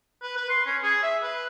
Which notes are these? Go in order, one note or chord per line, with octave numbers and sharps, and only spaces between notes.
B4
B4
C6
C#4
G#4
E5
B4